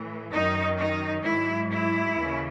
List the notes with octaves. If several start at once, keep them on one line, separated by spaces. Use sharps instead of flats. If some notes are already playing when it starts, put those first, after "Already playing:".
Already playing: A2 E3
F#2 D#3 F#3 D#4
D#4
G#2 F#3 E4
E4
D#2 C#3 E3